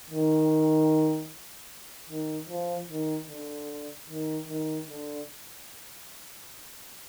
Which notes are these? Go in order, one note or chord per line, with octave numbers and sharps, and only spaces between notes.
D#3
D#3
F3
D#3
D3
D#3
D#3
D3